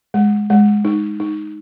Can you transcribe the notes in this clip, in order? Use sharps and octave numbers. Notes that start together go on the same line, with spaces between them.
G#3
G#3
D#4
D#4